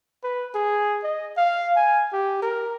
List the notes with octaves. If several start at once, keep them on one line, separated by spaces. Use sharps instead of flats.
B4
G#4
D#5
F5
G#5
G4
A#4